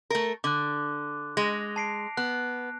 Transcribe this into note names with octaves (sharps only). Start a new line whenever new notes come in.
A3 A#4
D3 D6 F#6
G#3 A#6 F7
A5 C7 D7
B3 F#6